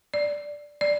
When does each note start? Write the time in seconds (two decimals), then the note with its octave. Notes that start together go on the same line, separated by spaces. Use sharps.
0.14 D5
0.81 D5